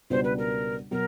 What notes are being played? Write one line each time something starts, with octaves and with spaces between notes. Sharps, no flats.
C#2 B2 G3 B3 D4 C5
B4
A#4
B2 F#3 A#4